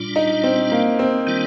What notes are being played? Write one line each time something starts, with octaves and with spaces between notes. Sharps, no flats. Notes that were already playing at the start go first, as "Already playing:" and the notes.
Already playing: A#2 G3 D4 F4
D#4
C4
A#3
C4
D#3 G3 D4 F4